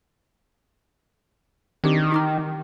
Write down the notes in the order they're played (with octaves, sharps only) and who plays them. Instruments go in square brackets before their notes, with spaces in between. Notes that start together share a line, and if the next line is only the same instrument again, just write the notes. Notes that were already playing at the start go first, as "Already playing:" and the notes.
[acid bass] D#3 [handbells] C4 D4 G4
[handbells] D#4 D6 F6